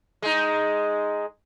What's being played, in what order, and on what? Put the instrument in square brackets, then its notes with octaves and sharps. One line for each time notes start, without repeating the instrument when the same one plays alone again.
[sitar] G#3 D#4